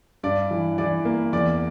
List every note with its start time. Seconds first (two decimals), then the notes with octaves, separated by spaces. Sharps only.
0.23 G2 D5
0.51 E3
0.78 E3 D5
1.05 A#3
1.33 E2 D5